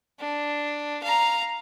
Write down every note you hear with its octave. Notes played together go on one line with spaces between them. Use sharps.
D4
F5 A#5